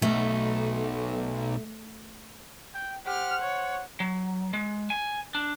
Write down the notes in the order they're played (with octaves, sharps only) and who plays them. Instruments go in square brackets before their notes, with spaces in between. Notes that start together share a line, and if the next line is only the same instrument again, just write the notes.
[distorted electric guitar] B1 [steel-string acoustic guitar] A3
[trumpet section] G5
[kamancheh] G4 F6 [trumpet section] C5 F#5
[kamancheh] C#5
[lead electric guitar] F#3
G#3
G#5
D4